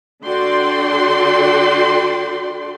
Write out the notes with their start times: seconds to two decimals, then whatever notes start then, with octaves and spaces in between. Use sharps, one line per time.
0.23 D3 F#4 A4 D5 G5 C6